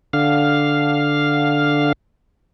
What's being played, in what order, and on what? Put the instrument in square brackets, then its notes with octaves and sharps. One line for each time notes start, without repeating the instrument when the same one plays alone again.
[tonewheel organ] D3 F5